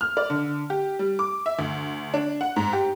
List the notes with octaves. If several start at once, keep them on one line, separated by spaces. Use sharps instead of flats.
F6
D5
D3
G4
G3
D6
E5
D2
D4
F#5
G#2
G4